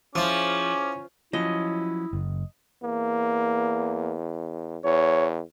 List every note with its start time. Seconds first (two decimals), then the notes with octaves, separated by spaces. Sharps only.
0.15 F3 C#4 E4 F4 G#4 D6
1.33 F3 F#3 C#4 E4 D#5
2.13 F#1
2.83 E2 A#3
4.84 E2 C#5